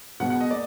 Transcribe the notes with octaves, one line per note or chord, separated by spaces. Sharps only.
B2 G#3 B3 F#5
F#5
D#5
A#3 D5